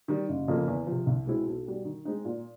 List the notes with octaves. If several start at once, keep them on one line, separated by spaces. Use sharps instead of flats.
D#3 G3
F#1
F2 C#3 F3 A#3
E2
C3 F3
C2
B2 G#3 C4 E4
B1
B2 G3
D#3
G#3 C4 D#4
A#2